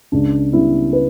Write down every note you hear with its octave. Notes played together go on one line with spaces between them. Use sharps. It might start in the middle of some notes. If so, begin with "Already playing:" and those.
C#2 D4
C#3 G3 B3 E4
B4